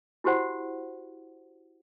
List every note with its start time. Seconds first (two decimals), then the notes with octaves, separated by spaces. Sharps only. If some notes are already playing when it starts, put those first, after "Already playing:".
0.24 E4 F#4 G4 C5 F#5